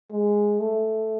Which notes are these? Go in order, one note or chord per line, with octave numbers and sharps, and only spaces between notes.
G#3
A3